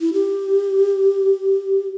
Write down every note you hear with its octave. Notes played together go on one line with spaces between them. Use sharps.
E4
G4